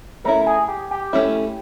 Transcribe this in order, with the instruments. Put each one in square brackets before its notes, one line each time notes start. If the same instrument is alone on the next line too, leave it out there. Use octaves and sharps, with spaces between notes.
[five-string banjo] A3 C#4 E4 [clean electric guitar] A#4
[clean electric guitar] G#4
G4
G4
[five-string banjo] A3 C#4 E4